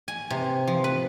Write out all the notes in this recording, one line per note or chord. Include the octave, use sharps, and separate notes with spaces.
G#5
C3
F3
B4